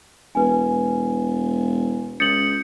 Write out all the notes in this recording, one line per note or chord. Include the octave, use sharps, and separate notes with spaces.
E1 B4 G#5
C#2 D#6 G6 A6 C#7 F#7